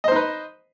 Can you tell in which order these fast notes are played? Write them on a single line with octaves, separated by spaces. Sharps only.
D#5 C5 D#4 B4